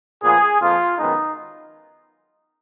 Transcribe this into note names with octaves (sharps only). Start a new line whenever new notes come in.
A#2 F3 B3 G#4
F2 F3 A#3 F4
F#2 D#3 G#3 B3 D#4